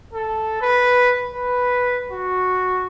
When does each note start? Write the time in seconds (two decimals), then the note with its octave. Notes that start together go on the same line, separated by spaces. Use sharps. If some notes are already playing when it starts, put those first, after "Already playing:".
0.13 A4
0.61 B4
1.34 B4
2.12 F#4